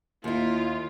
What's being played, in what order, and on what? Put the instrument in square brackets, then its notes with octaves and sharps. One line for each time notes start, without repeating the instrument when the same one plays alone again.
[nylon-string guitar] D#2 E4 [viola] F4